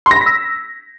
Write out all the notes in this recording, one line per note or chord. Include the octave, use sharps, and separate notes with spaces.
C6
A#6
B5
B6
E6